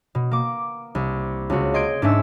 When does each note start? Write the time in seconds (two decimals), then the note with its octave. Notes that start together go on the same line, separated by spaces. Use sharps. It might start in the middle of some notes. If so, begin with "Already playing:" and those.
0.15 B2
0.31 A#3 D6
0.95 C2
1.50 C#2 F#4
1.74 D#5 C6 G6 G#6 D7
2.02 G#2 C#4 D4 E5 E6